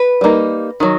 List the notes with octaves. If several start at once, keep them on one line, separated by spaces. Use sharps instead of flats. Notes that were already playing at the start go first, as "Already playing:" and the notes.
Already playing: B4
G3 A#3 D#4
D#3 F#3